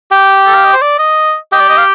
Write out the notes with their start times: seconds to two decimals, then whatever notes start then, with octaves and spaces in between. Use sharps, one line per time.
0.11 G4 G5
0.47 A4
0.55 F5
0.64 D#5
0.73 C5
0.82 D5
0.99 D#5
1.52 G4 D#5 G5
1.60 D5
1.69 D#5
1.78 F5